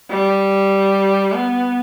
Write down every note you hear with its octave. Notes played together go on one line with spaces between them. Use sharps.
G3
B3